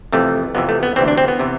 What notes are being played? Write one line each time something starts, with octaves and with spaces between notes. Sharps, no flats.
F2 C3 E3 A3
F2 C3 E3 B3
A3
B3
D2 C3 E3 C4
D4
C4
B3
C3 E3